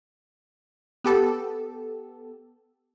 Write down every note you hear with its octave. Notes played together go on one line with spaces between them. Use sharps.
B3 G4 A4